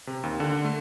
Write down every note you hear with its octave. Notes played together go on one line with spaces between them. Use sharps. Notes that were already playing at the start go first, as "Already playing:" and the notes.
C3
D#2
D3
A3